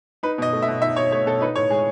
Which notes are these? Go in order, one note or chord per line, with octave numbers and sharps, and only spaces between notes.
D#4 B4
B2 D#5
A3
E5
B2
D#4 E5
B2 C#5
A3 C#5
B2 A4
D#4 B4
A2 C#5
G#3 G#4